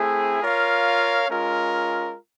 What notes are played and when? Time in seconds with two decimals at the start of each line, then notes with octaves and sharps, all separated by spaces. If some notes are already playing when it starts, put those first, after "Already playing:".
Already playing: A3 C4 E4 G#4
0.42 F4 A#4 C#5 F5
1.29 G#3 C#4 F4 A#4